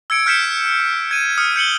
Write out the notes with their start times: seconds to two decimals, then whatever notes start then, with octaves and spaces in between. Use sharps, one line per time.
0.10 E6 G#6 C#7 D7
0.26 F6 G6 B6 C#7 E7
1.11 G#6 D#7
1.38 D#6 F6 C#7
1.56 G6 C#7 F#7 G7